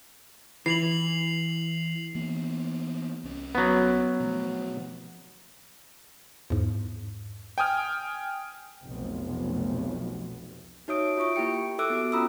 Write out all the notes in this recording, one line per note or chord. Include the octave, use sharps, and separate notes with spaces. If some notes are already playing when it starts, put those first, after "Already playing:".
E3 C7 F7 F#7
E3 A#3 B3
C2 C#4
F#3 B3
B2 F3 A3
E2 G#2
G5 G#5 D#6 F6
F1 B1
D#4 F#4 C#5 E5 D#6 D7
F4 E5 C#6 D7
A#3 E4 G4 G5 C#7 D7
A4 E5 D6 E6 F#6 D7
B3 F#4
C#4 F4 A#5 B5 D#6 E6